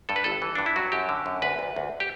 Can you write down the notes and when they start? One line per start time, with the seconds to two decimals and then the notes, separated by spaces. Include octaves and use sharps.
0.09 G2 A4
0.16 B4
0.24 G1 A4
0.42 E3
0.55 G2 D4
0.66 E4
0.76 F#3 F#4
0.92 F#2 G4
1.09 D3
1.26 F#2
1.42 D2 B4
1.59 D2
1.76 D2
2.00 G4